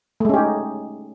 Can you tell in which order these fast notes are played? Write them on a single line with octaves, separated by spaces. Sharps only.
A3 G#3 C#4 G4 D#4